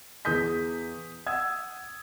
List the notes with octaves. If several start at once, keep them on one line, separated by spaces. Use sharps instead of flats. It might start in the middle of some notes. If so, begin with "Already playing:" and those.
E2 G#4 D#6 G6 B6
F#5 D#6 E6 G#6